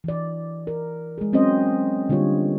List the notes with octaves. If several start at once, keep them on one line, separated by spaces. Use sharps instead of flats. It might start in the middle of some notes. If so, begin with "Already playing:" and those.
E3 D5
A#4
G#3 G#4
F#3 C4 C#4 C5 D#5
D3 G3 A#3 F4 C#5